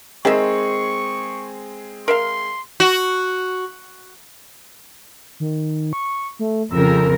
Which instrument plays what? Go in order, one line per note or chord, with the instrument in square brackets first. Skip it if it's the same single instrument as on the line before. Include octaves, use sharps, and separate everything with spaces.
[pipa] D#3 D#5 E5 [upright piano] G#3 C4 G#4 [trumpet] C#6
[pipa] A#4 E5 F5 [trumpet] C6
[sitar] F#4
[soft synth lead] D#3
C#6
A3
[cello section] F2 C#3 A#4 [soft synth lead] E6